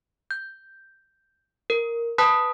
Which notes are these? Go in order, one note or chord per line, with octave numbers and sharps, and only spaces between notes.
G6
A#4
B4 A5 B5 D#6 F#6 B6